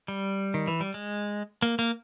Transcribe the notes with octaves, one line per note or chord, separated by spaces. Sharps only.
G3
D#3
E3
G3
G#3
A#3
A#3